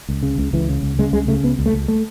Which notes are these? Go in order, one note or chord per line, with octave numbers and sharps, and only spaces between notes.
C#2
C#3
C#2
C#2 E3
C#3
C#2
C#3 G#3
C#2 G#3
C#3 A3
C#2 B3
C#2
A3
C#2
A3